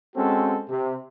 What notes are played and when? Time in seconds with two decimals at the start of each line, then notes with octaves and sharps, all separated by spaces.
0.16 G#3 C4 C#4 F#4 A4
0.69 C3